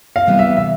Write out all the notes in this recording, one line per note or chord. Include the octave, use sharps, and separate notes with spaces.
F5
C3 E3 G3 B3
E5
E5